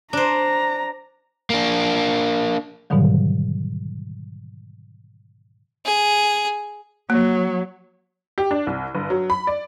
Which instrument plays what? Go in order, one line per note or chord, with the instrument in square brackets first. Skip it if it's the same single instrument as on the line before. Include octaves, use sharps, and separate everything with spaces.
[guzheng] D4 C5 [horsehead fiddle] A#5
[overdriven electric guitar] A#3 D4
[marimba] G#2 B2 D3 D#3 F#3 G3
[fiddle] G#4
[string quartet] F#3 [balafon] A#3
[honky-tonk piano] G4
D4
C2
G1
F#3
B5
D5